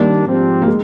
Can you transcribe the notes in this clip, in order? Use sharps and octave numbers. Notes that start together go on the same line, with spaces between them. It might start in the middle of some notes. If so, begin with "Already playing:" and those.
Already playing: D#3 G3 A#3 D4
G#2 F3 C4 G4
A#3
G#3